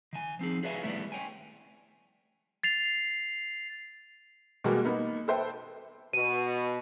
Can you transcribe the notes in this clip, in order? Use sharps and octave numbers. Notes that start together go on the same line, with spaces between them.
D#3 G#5
F3 C4 D#4 G#4
G#4 B4 C#5 E5 F5 G#5
D#3 G3 A3 B3 E4
C#5 G5 G#5
A6 C7 F7
B2 G3 G#3 A#3 F#4
A#3 B3 D#4
A4 B4 C5 E5 G5
B2 D#7